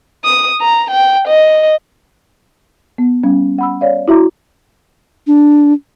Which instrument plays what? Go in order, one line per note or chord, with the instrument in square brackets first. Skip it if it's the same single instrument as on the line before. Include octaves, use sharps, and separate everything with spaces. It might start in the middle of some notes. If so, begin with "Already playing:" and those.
[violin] D#6
A#5
G5
D#5
[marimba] B3
G3 C#4
F#5 B5 E6
C#5 D5 F5
E4 F#4 E5 A#5 D6
[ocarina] D4